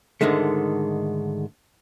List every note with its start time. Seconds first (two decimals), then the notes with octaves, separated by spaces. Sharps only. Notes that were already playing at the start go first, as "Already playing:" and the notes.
0.21 G#2 D3 D#3 G#3 A3